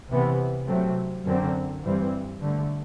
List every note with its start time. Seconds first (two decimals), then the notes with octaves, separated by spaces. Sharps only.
0.10 C3 E3 B3
0.68 C3 F#3 A3 C4
1.25 F#2 D3 F#3 C4
1.83 G2 E3 G3 C4
2.40 G2 D3 A3